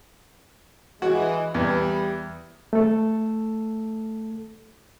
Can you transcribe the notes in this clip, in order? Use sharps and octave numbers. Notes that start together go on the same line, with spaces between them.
E3 G#3 F#4
E2 G3 B4
A3 A4